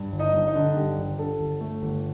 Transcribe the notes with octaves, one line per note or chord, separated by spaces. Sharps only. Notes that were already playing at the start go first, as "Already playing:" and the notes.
Already playing: G2
G1
D#4 D#5
G2
D#4 D#5
D3
G2 G4
G1
D3 A4
G1
A3
G1